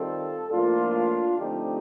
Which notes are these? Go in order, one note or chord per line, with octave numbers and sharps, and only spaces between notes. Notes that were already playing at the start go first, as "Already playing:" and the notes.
Already playing: D#3 G3 C4 F4 A4
A2 F3 A#3 D4 F4
D3 F3 A3 C4 D#4 G4